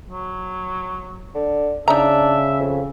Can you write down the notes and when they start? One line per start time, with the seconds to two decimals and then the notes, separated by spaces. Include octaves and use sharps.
0.10 F#3
1.35 D3
1.88 C#3 D4 D#4 E5 A#5
2.59 F2